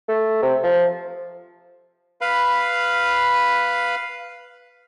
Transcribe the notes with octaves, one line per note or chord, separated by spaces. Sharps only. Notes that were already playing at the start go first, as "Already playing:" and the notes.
A3
C3
F3
B4 F5 B5